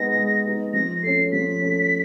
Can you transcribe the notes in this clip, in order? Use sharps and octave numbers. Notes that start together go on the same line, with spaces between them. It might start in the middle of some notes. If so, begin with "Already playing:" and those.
Already playing: G#3 B3 D#4 A#6
G#3
B3 D#4
F3 A#6
A3 C#4 C7
F3 B6
A3 C#4